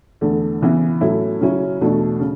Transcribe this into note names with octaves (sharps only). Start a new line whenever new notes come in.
E2 D3 A3
C#3 E3 B3 E4
A2 F#3 A3 C#4 E4
C#3 F#3 C#4 E4
E2 B2 A3 D4
C#3